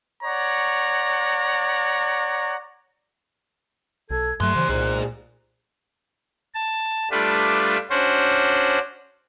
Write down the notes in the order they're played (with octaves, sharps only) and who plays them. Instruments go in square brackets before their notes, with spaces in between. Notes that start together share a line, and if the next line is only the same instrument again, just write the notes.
[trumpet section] C#5 D5 F#5 A#5
[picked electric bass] B1 [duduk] A4 [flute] G#6
[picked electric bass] G2 F#3 [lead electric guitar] G3 C6 [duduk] A3 [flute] F#6
[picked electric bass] C#3 E3 [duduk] C5
[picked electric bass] C2 [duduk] A#2 [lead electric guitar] G#4 C5
[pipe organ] A5
G3 A3 D4 F4 B4
C#4 D4 F#4 C5